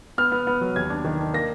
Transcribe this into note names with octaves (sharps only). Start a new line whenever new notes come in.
B3 F6
B3
B3
F#3
D#2 G#6
D4
D#3
D4
A#3 A#6